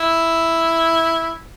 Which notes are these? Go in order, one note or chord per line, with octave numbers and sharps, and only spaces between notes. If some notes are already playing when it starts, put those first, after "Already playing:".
Already playing: E4